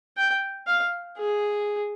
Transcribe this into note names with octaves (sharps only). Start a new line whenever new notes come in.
G5
F5
G#4